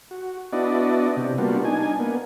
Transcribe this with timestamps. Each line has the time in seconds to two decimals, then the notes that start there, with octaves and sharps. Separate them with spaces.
0.11 F#4
0.53 B3 D4 E4 F#4 D5 D#5
1.17 C3
1.38 G3 A#3 B3 D4 F4 F#4
1.65 D4 D#4 G#5
2.00 A#3 B3